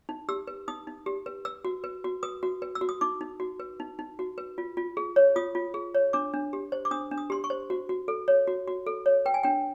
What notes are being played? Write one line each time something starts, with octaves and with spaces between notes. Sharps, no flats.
D#4
G4 E6
B4
D#4 D#6
D#4
G4
B4
B4 E6
F#4
B4
F#4
B4 D#6
F#4
B4
E6
F#4
D#6
D#4 D6
D#4
F#4
B4
D#4
D#4
F#4
B4
F4
F4
G#4
C#5
F4 D#6
F4
G#4
C#5
D4 D6
D4
G4
C5
D6
D4 D#6
D4
D#6
G4 C6
C#6
C5
F#4
F#4
A4
C#5
F#4
F#4
A4
C#5
B4 G5
G#5
D4 G5